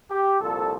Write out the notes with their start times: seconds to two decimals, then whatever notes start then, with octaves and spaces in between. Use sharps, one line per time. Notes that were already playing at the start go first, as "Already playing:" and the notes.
0.11 G4
0.40 C2 A#2 F3 A4